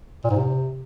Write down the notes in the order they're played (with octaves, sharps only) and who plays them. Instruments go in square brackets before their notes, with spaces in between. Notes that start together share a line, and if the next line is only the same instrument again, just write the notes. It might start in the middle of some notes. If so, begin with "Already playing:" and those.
[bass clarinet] A#2
G#2
C3